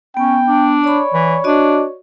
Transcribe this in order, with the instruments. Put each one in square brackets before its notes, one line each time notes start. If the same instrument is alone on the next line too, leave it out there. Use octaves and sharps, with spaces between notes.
[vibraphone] B3 [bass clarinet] C#4 [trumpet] G5
[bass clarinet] D4
[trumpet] C#5 [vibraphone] D5 B5
[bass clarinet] E3
[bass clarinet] D4 [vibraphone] F#4 D5 D#5